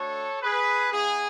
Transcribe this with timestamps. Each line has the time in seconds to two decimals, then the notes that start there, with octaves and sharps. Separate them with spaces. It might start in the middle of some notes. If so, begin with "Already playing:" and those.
Already playing: A3 D4 F#4 A4 C#5
0.42 G#4 B4
0.92 B3 E4 G#4